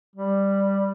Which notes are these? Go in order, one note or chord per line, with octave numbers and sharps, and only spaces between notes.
G3